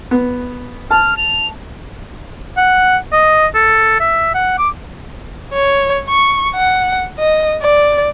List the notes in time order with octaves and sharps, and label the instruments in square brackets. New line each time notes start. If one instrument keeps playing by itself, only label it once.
[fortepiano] B3
[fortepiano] A5 [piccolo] F6
[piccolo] F7
[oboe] F#5
D#5
A4
E5
F#5
D6
[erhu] C#5
C#6
F#5
D#5
D5